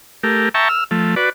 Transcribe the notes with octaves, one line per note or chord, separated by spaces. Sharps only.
A3 G4 A#4
E5 G5 A5 A#5 C#6
E6 F6
F3 A3
F#4 B4 D5